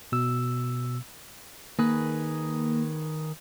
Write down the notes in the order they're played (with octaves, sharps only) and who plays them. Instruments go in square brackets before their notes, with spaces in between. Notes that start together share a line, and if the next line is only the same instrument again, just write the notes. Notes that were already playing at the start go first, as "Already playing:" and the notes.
[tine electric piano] B2 E6
[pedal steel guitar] D#3 G#4 B4 [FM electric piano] A#3